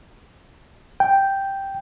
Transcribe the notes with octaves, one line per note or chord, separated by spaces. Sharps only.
G5